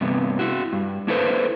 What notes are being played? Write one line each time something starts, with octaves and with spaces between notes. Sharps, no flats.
G2 C3 B3
E4 F#4
G2
A#3 E4 A4 B4 C5